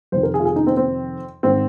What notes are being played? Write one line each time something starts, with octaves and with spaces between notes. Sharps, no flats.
F2 C3 D#3 C5
A#4
G#4
F4
G#4
D#4
C4
C4
G#2 D#3 C4